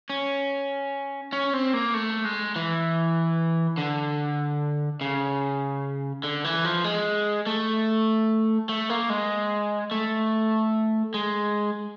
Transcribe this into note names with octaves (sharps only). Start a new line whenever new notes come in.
C#4
C#4
C4
A#3
A3
G#3
E3
D3
C#3
D3
E3
F3
G#3
A3
A3
A#3
G#3
A3
G#3